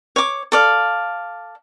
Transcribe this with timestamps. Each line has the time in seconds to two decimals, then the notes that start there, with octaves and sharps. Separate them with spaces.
0.16 C#5 D6
0.52 A4 D5 F5